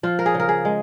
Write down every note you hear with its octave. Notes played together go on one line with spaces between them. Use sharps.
F3 F4
A#4
G#4
C#3
A#4
G#4
G#3